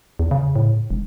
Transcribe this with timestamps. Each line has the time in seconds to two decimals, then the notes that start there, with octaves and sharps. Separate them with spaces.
0.19 E2
0.31 C#3
0.56 A2
0.90 E1